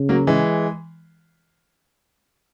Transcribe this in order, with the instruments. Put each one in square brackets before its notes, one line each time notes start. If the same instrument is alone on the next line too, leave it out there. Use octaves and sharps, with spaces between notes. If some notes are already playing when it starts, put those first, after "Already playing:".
Already playing: [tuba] C#3
[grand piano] F#3 A#3
E3 G#3